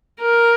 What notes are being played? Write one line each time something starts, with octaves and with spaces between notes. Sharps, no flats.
A#4